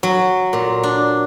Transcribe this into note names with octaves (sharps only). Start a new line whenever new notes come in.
F#3
A#2
D4